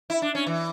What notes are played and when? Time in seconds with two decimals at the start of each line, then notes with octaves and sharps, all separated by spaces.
0.10 E4
0.22 D4
0.35 C#4
0.46 E3